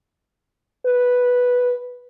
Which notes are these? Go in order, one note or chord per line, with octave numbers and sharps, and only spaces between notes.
B4